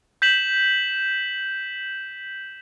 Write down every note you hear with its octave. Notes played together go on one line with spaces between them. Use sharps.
G6 B6 E7 F#7